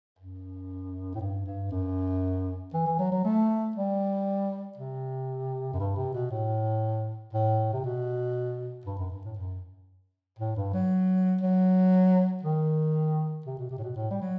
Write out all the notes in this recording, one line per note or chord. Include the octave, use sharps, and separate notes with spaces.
F#2
A2
G2
G2
F#2
E3
E3
F#3
F#3
A3
G3
C3
F#2
G2
C3
B2
A2
A2
C3
B2
G2
F#2
G2
A2
F#2
A2
G2
F#3
F#3
D#3
C3
B2
C3
A2
B2
A2
G3
F#3